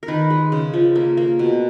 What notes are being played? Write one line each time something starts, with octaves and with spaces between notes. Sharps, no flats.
A#4
D#3 B4
G#3
C#3
F3
A#3
A#3
B2